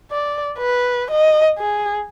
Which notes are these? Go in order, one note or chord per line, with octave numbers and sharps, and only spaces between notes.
D5
B4
D#5
G#4